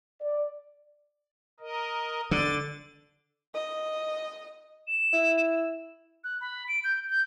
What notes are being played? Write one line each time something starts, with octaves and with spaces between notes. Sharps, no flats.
D5
A#4 D#5
D3 A6
D#5
E7
E4
F#6
B5
D7
G6
G6